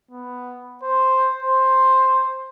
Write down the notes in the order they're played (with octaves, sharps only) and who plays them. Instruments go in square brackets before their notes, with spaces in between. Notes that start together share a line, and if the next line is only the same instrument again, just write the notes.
[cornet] B3
C5
C5